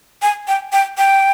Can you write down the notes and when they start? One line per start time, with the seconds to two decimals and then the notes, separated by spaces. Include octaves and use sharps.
0.22 G#5
0.48 G5
0.72 G5
0.98 G5